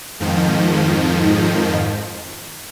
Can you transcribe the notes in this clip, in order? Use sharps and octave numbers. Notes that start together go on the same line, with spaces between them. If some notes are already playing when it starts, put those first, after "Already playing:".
F2 G#2 D#3 F3